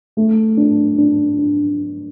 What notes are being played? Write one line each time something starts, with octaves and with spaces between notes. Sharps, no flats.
A3
D4
D4
D4